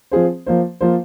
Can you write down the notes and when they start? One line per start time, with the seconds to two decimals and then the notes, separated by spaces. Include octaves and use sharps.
0.11 F3 C4 F4 G#4 C5
0.46 F3 A#3 F4 C5
0.81 F3 A#3 F4 C5